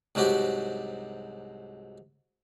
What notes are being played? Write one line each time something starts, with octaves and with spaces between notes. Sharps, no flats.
C2 G#2 F#3 F#4 G4